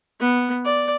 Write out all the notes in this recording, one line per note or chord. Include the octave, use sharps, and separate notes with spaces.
B3
D5